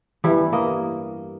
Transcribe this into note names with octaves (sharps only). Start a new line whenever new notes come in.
G2 E3 G3 E4
A#3 D#5